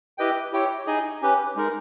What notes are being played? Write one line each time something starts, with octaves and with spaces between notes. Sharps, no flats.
E4 G4 B4 D#5 G5
E4 G4 C#5 G5
D#4 G#4 D#5 G#5
C#4 G4 B4
G#3 D#4 A#4